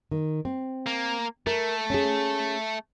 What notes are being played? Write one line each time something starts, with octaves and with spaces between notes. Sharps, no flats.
D#3
C4
A#3
A3 A#4
C#4 G#4